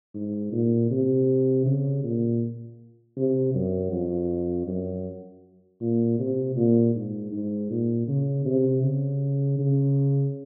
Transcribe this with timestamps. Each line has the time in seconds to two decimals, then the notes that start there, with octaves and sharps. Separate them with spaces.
0.15 G#2
0.52 A#2
0.91 C3
1.66 C#3
2.04 A#2
3.17 C3
3.54 F#2
3.92 F2
4.68 F#2
5.81 A#2
6.19 C3
6.56 A#2
6.95 G#2
7.32 G#2
7.71 A#2
8.07 C#3
8.45 C3
8.83 C#3
9.59 C#3